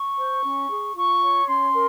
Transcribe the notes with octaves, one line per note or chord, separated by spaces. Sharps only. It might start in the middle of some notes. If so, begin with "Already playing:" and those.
Already playing: C#6
C5
C#4
G#4
F4 C#6
C#5
C#4 C6
A#4